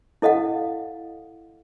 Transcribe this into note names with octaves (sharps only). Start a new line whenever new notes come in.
E4 A4 D#5 F5 F#5